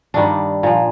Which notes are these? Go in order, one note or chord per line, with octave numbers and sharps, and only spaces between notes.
G2 D#3 G3 D4
A#2 F3